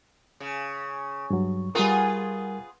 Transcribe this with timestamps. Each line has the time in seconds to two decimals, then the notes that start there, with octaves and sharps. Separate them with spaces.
0.40 C#3
1.30 G2 F#3
1.75 G3 B3 F4 G#4 A#4